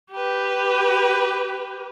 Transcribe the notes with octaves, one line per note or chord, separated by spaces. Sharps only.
G4 B4